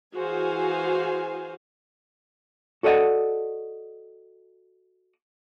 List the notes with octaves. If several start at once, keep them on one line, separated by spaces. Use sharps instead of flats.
E3 F#4 G#4 C5 F5 G#5
F#4 A4 D5 D#5 F#5